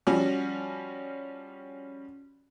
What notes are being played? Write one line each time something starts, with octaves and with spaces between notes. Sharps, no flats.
F3 G3 C#4 F#4